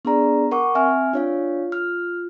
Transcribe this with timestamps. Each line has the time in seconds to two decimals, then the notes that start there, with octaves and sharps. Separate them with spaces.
0.05 B3 D4 G#4 D5 A#5
0.51 A#4 F#5 C#6 D6
0.75 C4 E5 G#5 F6
1.13 D4 F4 C#5 F5
1.72 F6